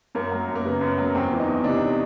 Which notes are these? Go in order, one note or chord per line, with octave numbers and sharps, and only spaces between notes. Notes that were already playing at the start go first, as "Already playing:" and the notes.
F#2 A#3
F#3
F#2
A#3
C#3 B3
F#2
F#3
E2 C4
E3
D#4
E2
C3 D4
D#4